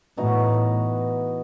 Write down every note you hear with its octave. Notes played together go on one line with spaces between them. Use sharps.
A2 E3 B3 D#4 F#4